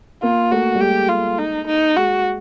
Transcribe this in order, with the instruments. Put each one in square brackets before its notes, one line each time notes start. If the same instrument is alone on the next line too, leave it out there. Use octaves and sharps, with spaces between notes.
[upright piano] A#3 [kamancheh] F4
[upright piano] A3 [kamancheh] F#4
[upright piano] G3
[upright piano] G#3 [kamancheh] G4
[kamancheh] F4
D#4
D#4
[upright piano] G#3 [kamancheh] F#4